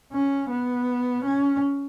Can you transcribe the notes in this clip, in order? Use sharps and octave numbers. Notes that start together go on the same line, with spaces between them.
C#4
B3
C#4